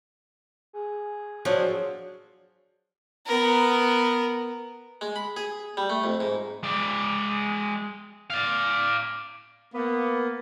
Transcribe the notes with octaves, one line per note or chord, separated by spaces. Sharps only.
G#4
F3 F#3 D4
B3 A#4
G#3
B5
G#4
G3
A3
F2
G#2
G#3 D5
D5 F5
A#3 B3